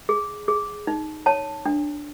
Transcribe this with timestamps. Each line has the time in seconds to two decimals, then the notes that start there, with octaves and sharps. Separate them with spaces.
0.09 G#4
0.48 G#4
0.87 D#4
1.26 C#5 A5
1.66 D4